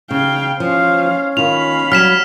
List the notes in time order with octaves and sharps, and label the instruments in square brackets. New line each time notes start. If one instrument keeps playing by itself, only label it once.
[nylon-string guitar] C#3 [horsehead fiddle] F5 G5
[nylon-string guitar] F3 [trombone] C#4 [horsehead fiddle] C5 F5
[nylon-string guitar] D#3 F4 [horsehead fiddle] F5 B5 [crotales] F7
[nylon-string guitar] F#3 G3 [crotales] F6 B6 E7